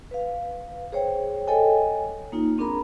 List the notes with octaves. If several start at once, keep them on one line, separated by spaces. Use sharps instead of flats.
B4 F5
G#4 C5 C#5 G5
A4 C#5 D#5 G5 G#5
A#3 D#4 F4
C4 D4 G#4 A#4 A#5 B5